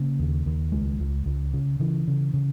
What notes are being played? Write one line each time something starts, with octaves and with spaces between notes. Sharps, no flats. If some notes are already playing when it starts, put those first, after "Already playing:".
Already playing: C#3 A#3
D#2
D#2
C#2 G#3
C#2
C#2
C#3
C#3 E3
C#3
C#3